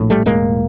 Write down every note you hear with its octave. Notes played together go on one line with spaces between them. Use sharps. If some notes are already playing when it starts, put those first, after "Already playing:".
Already playing: A#1 A2
G3 A3
E1 G#3 A#3